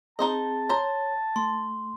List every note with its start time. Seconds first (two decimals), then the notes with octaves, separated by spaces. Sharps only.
0.19 C4 D#4 G#4 C5 D#5 A5
0.69 C5 C#5 A#5
1.36 A3 C6